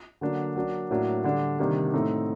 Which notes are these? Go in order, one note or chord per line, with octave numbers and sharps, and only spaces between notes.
D3 F#3 A#3 D4
F#3 A#3 D4
A2 F#3 A#3 D4
D3 G3 D4
C3 D#3 G3 A#3 D4
A2 A3 C4 D#4